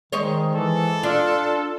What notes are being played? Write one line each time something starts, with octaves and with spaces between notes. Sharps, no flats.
D#3 G#3 C5 C#5
E3 A4
D4 F4